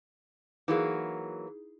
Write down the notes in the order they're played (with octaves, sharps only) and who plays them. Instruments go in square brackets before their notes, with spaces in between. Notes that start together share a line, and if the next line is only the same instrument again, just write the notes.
[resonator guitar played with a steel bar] E3 F#3 A#3 [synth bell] D#4 E4 G#4